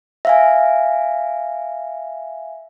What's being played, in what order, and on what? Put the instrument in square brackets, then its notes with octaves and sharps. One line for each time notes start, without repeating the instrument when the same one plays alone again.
[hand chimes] E5 F5 G#5